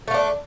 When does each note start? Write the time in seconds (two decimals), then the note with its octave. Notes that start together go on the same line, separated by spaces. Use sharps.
0.08 A3
0.11 F4
0.14 D4